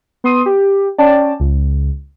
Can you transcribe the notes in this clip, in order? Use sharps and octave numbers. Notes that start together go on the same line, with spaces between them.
B3 C6 D#6 D#7
G4
C#4 D5 G5 A5
C#2